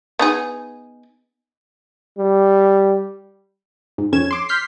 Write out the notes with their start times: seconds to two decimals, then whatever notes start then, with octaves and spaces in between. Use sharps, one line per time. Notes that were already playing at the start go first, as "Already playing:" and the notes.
0.19 B3 D#4 G#4
2.18 G3
3.98 G#2
4.12 F2 C#4 G#6 E7
4.31 C6 D6
4.49 C6 F6 G6 B6 C7